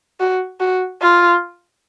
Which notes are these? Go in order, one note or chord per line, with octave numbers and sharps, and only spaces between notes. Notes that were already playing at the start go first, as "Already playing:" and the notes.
F#4
F#4
F4